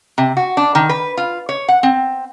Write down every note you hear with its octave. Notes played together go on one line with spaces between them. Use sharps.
C3
F#4
D4
D#3
B4
F4
C#5
F#5
C4